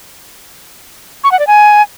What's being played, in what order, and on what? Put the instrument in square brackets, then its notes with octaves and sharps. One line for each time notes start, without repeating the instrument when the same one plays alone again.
[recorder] C#6
F#5
D5
G#5